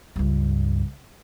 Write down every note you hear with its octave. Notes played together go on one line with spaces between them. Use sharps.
C#2 G2